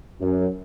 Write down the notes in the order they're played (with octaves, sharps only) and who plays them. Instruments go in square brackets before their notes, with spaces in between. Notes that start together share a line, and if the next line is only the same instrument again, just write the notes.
[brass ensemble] F#2